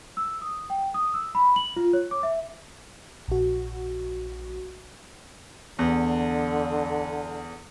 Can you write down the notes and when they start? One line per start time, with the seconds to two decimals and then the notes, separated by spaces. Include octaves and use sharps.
0.17 E6
0.42 D#6
0.70 G5
0.94 D#6
1.14 E6
1.35 B5
1.56 F#7
1.76 F4
1.93 C#5
2.11 D6
2.23 E5
3.28 A#1 F#4
5.79 E2 D3